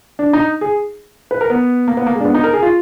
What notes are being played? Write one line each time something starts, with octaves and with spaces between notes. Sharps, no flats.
D4
D#4
G#4
B4
A#4
B3
A#3
B3
A#3
G#3
D4
B3
D#4
A#4
G#4
F4